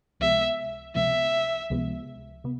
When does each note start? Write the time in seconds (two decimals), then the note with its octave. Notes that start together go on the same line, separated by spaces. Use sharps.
0.20 C#2 C3 F3 G#3 B3 E5
0.95 C#2 C3 F3 G#3 B3 E5
1.70 C#2 C3 F3 G#3 B3
2.44 C3 B3